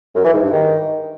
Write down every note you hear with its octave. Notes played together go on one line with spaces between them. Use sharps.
F#2
E3
G#2
G2
D#3